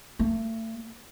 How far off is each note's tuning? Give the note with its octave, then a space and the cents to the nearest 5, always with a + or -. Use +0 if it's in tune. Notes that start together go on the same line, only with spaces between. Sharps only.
A3 +35